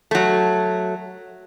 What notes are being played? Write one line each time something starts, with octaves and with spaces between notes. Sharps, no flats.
F#3 A3